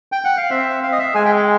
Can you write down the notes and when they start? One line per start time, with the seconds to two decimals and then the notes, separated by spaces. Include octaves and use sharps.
0.12 G5
0.25 F#5
0.37 F5
0.51 C4 E5
0.83 F5
0.92 D#5
0.99 E5
1.15 G#3 G#5
1.25 G5
1.36 G5